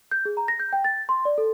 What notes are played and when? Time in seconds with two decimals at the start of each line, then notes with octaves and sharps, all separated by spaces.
0.11 G6
0.25 G#4
0.37 A#5
0.48 A#6
0.60 G6
0.73 G5
0.84 A6
1.09 C6
1.25 D5
1.38 A4